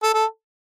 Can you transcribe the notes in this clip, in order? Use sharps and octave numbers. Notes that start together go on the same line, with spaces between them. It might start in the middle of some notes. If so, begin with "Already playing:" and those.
A4
A4